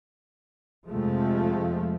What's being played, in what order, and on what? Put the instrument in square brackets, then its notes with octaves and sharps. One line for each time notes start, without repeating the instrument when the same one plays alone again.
[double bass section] F2 C3 F3 G#3 A3